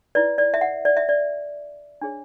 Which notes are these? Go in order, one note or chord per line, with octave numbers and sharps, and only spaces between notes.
E4 B4 D5
D5
E5
F#5
D5
E5
D5
D4 G#4 C#5